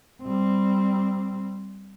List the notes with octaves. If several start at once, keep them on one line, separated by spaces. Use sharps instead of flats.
G3 C4